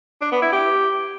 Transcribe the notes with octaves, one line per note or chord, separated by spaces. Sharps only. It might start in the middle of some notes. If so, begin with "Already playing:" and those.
D4
B3
E4
G4